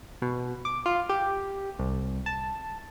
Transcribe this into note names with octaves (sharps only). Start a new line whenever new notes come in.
B2
D6
F4
G4
C2
A5